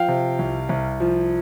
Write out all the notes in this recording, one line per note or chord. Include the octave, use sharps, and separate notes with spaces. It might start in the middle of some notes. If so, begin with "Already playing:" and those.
Already playing: F3 F5 G5
C3
C2
C2
F3